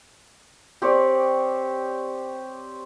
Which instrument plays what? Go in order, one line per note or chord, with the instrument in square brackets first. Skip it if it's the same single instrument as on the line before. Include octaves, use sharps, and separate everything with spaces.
[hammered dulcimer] C4 [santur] G4 C#5 D5